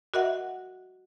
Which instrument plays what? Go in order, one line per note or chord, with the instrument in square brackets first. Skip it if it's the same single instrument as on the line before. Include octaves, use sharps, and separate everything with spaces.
[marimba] F#4 A#4 D#5 E5 F#5